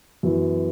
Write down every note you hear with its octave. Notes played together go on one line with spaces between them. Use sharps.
F#2 E3 B3